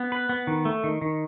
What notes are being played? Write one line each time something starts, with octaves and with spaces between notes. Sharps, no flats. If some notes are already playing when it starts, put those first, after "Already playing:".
Already playing: B3
B4
B3
D#3
A3
D#3
D#3